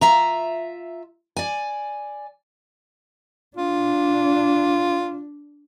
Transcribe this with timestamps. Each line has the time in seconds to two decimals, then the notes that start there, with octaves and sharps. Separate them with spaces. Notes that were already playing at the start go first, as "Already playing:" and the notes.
0.01 F4 E5 A#5
1.37 D5 G#5
3.57 D4 F4